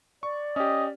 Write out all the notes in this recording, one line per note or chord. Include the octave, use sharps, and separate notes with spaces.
D5 C#6
C#4 G4 D#5